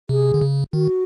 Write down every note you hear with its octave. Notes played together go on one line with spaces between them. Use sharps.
C3 G#4
D3
C#3
D#3 F#4